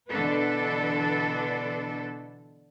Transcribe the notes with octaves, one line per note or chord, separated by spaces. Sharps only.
B2 D3 E3 D4 A4 B4